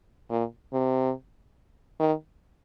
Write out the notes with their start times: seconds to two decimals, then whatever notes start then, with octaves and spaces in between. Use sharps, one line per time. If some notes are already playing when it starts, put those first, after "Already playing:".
0.30 A#2
0.73 C3
2.00 D#3